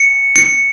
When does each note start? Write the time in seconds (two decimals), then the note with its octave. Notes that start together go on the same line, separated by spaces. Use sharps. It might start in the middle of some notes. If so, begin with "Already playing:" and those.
Already playing: C#7
0.36 C#7